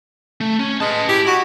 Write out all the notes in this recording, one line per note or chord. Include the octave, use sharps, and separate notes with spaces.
A3
C#4
G#3 B4 A5
E4 G4
F#4